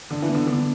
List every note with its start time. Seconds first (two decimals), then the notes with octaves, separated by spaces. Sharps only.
0.11 D3 D4
0.22 E3
0.29 B3
0.35 D3
0.46 D3 B3